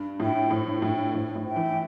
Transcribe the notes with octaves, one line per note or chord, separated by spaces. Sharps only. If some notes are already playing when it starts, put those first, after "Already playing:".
Already playing: G2
A2 E5 G5
A2 C5
G2
A2 E5 G5
G2
A2 C5
A2
E5 G5
E3